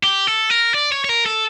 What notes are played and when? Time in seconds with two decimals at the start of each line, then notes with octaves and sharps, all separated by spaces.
0.03 G4
0.27 A4
0.50 A#4
0.74 D5
0.92 C#5
1.05 C#5
1.09 A#4
1.26 A4